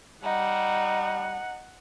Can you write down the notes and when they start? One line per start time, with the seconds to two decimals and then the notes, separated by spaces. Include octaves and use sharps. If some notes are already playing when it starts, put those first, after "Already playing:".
0.23 G3 D#4 F#5